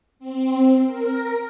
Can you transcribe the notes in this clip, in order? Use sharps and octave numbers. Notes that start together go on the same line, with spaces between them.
C4
A#4